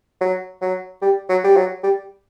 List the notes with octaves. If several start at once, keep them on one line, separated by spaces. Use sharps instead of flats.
F#3
F#3
G3
F#3
G3
F#3
G3